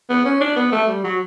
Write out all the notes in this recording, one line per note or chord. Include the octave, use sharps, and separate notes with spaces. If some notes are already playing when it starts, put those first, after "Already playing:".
B3
C#4
D4
B3
A3
G3
F#3